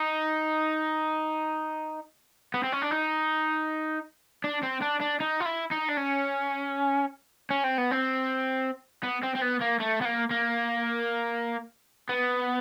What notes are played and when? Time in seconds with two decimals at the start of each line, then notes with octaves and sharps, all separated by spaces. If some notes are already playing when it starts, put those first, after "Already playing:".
Already playing: D#4
2.54 B3
2.64 C4
2.72 C#4
2.82 D4
2.91 D#4
4.44 D4
4.63 C4
4.82 D4
5.01 D4
5.20 D#4
5.40 F4
5.46 E4
5.71 D#4
5.89 D4
5.97 C#4
7.50 C#4
7.64 C4
7.78 B3
7.91 C4
9.03 B3
9.23 C4
9.35 C4
9.41 B3
9.61 A#3
9.80 A3
10.01 B3
10.05 A#3
10.31 A#3
12.09 B3